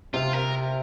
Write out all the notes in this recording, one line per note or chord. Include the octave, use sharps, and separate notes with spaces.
C3 F4
A#4